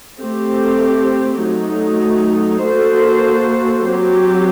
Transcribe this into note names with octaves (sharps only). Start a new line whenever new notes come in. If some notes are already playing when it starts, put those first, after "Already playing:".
A3 C4 G4
F#3 A3 D#4
A#3 F#4 A4 C5
F#3 C4 G4